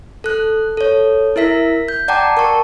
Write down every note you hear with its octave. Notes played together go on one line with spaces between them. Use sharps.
A4 F#6
A4 C#5
E4 A#4 E5 B6
G6
D5 F#5 G5 A5 A#5 D6
A#4 A5 C#6